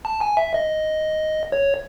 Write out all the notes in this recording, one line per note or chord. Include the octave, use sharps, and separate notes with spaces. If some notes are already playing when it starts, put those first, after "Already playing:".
A5
G#5
E5
D#5
C#5